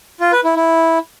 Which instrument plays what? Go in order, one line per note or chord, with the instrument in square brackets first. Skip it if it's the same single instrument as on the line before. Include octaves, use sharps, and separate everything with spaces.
[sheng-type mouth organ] F4
B4
E4
E4